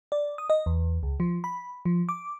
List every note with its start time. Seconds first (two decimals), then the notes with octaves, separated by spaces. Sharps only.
0.12 D5
0.38 D#6
0.50 D#5
0.66 E2
1.03 C#2
1.20 F3
1.44 B5
1.85 F3
2.09 D6